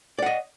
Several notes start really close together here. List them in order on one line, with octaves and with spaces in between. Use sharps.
D5 F#5 D#5